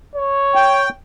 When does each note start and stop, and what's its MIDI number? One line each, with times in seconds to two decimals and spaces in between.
0.16 0.87 73
0.55 0.89 79